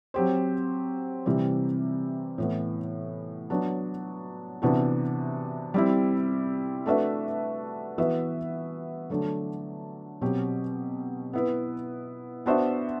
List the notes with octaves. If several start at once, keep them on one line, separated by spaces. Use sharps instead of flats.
F#3 C4 G4 C5
C3 E3 G3 C4
A2 E3 B3
F#3 B3 D4 F#4
C3 E3 B3 D4 F#4
G3 C4 E4
A3 D4 F#4 B4 E5
E3 B3 F#4 B4 E5
D3 F#3 A3 D4
B2 F#3 C4 G4
B3 E4 B4
B3 D4 F#4 C5 E5